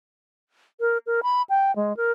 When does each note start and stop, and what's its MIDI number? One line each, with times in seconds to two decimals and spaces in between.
0.80 0.98 70
1.06 1.20 70
1.23 1.42 83
1.50 1.74 79
1.76 1.96 56
1.97 2.12 70